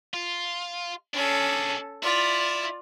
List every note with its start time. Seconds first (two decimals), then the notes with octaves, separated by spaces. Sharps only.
0.14 F4
1.14 C#4 D4 G#4 A4
2.03 E4 F4 D5